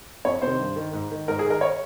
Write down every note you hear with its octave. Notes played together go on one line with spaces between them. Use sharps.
F2 C#5
C3 D#3 C5
G2
D#3
G#2
D#3
G#2 A#4
G#4
D#3
A#4
C#5